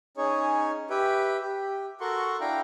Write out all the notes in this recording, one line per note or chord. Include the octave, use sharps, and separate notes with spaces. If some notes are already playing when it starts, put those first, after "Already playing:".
C#4 D#4 G#4 C#5
G4 B4 E5 G5
G4
F#4 A4 A#4 F#5 C6 C#6
D4 E4 F5 G5 A#5